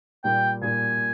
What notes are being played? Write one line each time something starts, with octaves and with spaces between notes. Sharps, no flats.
A#2 G3 A#3 G5
A#2 G3 A#3 G#5